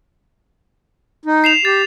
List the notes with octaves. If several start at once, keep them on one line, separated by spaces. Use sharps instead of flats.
D#4
C7 E7 F7
G4 A6